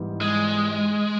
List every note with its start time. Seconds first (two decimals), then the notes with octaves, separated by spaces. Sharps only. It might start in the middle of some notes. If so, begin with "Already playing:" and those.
Already playing: G#2 E3 G3 B3
0.21 G#3